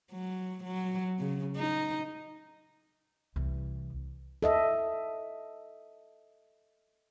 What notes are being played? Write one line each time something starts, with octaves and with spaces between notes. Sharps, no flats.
F#3
F#3
C#3
D#4
C2 E3
A4 D#5 E5